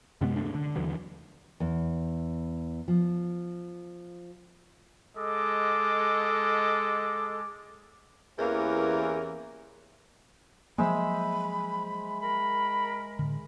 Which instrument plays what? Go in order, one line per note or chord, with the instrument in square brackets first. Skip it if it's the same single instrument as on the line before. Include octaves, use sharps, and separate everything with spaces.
[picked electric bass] F#2 C3 G#3 B3
D2 G2 A3 D4
D3
D#2 D3 E3 F#3
[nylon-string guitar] E2
F3
[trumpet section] G#3 A4 D#5 D6
[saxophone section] E2 E3 A#3 C#4 G4 A#4
[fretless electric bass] F3 F#3 A#3 [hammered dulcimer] G#3 C5 E5 [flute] B5
[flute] A#4 [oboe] B5
[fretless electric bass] A2 D3